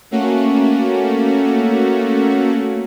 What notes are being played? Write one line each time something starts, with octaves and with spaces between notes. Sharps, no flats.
A3 A#3 C#4 F#4